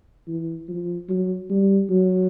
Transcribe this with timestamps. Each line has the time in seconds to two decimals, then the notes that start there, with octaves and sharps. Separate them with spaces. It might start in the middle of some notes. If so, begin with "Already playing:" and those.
0.28 E3
0.68 F3
1.09 F#3
1.50 G3
1.90 F#3